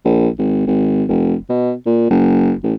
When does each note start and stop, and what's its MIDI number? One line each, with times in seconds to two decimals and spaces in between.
0.05 0.29 34
0.38 0.64 32
0.67 1.04 32
1.09 1.35 29
1.49 1.74 47
1.86 2.07 46
2.10 2.52 30
2.63 2.73 33